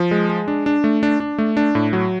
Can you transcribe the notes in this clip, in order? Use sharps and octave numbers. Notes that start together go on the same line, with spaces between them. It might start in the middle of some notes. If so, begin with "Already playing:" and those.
Already playing: F3
G#3
G#3
D4
D4
A3
D4
D4
A3
D4
A2
F#3